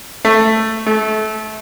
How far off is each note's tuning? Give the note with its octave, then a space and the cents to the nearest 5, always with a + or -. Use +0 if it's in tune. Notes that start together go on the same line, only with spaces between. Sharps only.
A3 +10
A3 -25